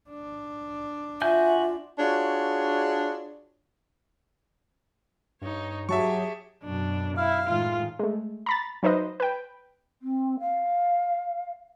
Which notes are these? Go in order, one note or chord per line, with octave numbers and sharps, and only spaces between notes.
D4
F4 F#4 E5 G#5 G6
D4 F4 F#4 G#4 C#5
G2 D#4 C#5
F#3 G4 G#4 E5 A5 C#6
F#2 B2 D4
E4 F5
A2 D#3 G#3 F4
G#3 A3
A#5 B5 A6
F#3 D#4 B4 C5 D#5
B4 G5
C4
F5